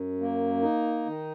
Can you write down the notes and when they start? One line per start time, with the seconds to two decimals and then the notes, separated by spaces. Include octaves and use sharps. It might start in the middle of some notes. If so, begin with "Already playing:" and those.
Already playing: F#2
0.21 A#3
0.62 D#4
1.06 D#3